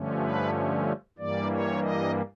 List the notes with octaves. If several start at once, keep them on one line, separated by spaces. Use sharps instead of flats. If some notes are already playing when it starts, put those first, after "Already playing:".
Already playing: G2 D3 F3 A3 C#4
B4
G2 E3 G3 A#3 D5
C#5
D#5